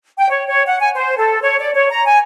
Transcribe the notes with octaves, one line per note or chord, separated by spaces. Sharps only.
G5
C#5
C#5
F#5
G#5
C5
A4
C#5
D5
C#5
A#5
G#5